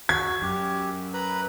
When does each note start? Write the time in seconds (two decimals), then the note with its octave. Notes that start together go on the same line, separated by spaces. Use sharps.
0.09 F#4 G#6
0.42 F#2 G4
1.14 B4 A#5 B5